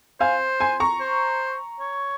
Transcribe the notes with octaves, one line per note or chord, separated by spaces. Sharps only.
C5 F5 G#5
G#5 C6
A#5 C#6
C5
C#5